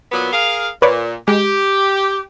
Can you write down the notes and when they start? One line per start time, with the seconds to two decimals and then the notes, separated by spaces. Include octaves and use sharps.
0.12 A#2 F#3 B3
0.33 G#4 A#4 F5
0.82 A#2 B4 C#5 D5
1.28 G#3 G4